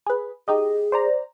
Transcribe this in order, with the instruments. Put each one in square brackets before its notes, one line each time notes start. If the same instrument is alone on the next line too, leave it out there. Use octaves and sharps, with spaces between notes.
[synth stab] G#4 B4
[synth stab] D#4 G4 D#5 [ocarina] G#4
[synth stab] C5 D5 A#5